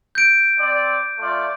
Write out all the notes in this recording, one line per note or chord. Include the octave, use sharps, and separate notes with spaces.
G6 D7
C4 D5
A3 F4 D5